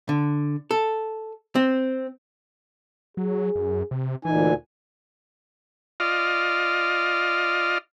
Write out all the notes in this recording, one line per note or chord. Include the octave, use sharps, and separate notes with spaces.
D3
A4
C4
F#3 G#4
F#2
C3
D2 A#2 E3 D#4 G#5
F4 D5 D#5 F6